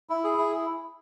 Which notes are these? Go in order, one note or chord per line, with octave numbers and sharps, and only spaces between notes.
E4
G#4
E4